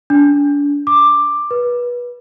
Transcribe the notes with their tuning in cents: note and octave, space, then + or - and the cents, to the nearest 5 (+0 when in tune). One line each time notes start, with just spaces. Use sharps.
D4 -35
D6 +10
B4 -25